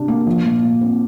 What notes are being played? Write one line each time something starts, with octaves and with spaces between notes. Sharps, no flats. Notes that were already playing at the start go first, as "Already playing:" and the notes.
Already playing: C3 D4
A#3
F3
A#2
A#2
C4